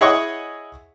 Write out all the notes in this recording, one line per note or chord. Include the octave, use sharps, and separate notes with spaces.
E4 G#4 C#5 D#5 F#5 C#6